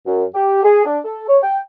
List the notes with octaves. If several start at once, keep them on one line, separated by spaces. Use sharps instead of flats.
F#2
G4
G#4
D4
A4
C#5
G5